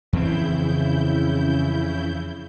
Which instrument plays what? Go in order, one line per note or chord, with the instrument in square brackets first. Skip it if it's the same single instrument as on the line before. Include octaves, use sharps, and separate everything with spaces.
[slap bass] F2 E3 C4 [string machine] C#3 E4 G6